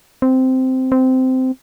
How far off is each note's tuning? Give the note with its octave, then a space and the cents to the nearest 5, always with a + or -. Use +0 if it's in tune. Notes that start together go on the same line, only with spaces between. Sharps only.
C4 -10
C4 -15